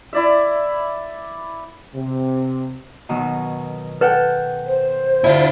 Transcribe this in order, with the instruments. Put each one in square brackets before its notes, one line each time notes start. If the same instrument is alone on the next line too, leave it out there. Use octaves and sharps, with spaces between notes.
[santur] E4 D5 E5
[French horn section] C3
[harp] B2 D#3 F#3
[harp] A4 F#5 G5 [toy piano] B4
[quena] C5
[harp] D3 [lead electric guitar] E4 F4